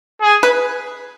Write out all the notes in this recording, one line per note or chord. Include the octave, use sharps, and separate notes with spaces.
G#4
B4